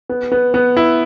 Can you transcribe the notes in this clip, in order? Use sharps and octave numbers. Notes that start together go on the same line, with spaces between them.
B3
B3
B3
E4